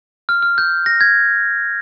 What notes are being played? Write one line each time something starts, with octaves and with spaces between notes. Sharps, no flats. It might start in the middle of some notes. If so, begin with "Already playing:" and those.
F6
F6
G6
A#6
G#6